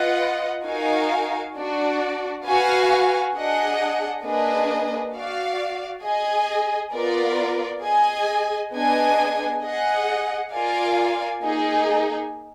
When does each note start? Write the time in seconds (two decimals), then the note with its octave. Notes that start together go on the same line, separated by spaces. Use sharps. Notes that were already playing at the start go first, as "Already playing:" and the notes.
Already playing: F4 B4 D#5 F#5
0.65 D#4 F#4 A#4 F5 G#5
1.55 D4 F#4 D5
2.45 F#4 B4 F5 G#5
3.35 D4 G#4 D#5 F#5
4.24 A#3 D4 G#4 B4 D#5
5.13 F#4 D5 F5
6.03 G#4 D#5 G#5
6.93 B3 F4 A#4 D5
7.83 G#4 D#5 G#5
8.73 B3 D4 G#4 D#5 G#5
9.63 G#4 D#5 F#5
10.53 F4 A#4 D5 F5 G#5
11.42 A#3 D#4 G#4